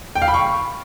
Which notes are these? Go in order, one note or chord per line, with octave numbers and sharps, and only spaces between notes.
G5
F5
B5
C#6